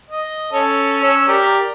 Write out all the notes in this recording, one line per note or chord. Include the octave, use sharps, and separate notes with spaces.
D#5
C#4 A4 C#5
C#4 E6
G4 A#4 D5